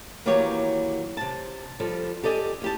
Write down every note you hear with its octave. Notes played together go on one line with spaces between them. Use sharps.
D#3 E3 F#3 A#3 G4 C#5
C3 A5
F3 G3 A4
G4 A4 D5 D#5 G#5
E2 G4 A5